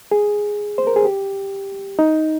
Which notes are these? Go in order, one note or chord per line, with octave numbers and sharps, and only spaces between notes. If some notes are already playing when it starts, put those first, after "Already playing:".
G#4
C5
A#4
G#4
G4
D#4